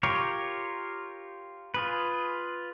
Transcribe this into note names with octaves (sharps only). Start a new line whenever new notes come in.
F4 G4 A#4 C#5
F4 G#4 B4